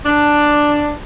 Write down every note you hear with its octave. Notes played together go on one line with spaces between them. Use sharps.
D4